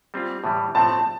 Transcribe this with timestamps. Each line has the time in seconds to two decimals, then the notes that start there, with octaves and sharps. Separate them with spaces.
0.14 G3 C4 F4
0.44 A2 E3 G3
0.75 A2 F3 A3 C4 A5